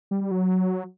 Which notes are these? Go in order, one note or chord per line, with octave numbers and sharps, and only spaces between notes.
G3
G3
F#3